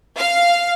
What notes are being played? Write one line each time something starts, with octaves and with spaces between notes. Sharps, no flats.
F5